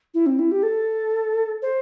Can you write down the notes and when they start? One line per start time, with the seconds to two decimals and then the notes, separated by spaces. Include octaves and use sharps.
0.14 E4
0.26 C4
0.39 E4
0.52 G4
0.63 A4
1.62 C5